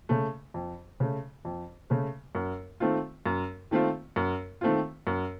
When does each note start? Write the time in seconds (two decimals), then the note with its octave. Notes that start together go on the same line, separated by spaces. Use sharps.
0.09 C#3 A3
0.54 F2
1.00 C#3 A3
1.45 F2
1.90 C#3 A3
2.35 F#2
2.80 D#3 A3 C4 F4
3.26 F#2
3.71 D#3 A3 C4 F4
4.16 F#2
4.61 D#3 A3 C4 F4
5.07 F#2